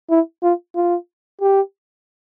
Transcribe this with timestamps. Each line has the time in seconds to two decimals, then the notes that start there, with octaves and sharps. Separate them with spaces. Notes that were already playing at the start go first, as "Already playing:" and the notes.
0.10 E4
0.43 F4
0.76 F4
1.41 G4